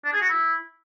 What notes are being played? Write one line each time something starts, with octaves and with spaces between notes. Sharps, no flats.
D4
G#4
F#4
E4